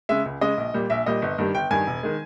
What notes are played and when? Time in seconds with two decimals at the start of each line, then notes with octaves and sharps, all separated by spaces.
0.09 C#3 G#3 E5
0.25 C#2
0.41 C#3 G#3 D#5
0.57 A#1
0.74 A#2 G3
0.90 A#1 E5
1.06 A#2 G3 D#5
1.22 G1
1.38 G2 D#3 G3
1.55 G1 G5
1.70 G2 D#3 G3 G#5
1.87 E1
2.03 D#3 G#3